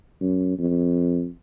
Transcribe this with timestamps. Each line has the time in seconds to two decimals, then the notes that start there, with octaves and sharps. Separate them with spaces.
0.21 F#2
0.59 F2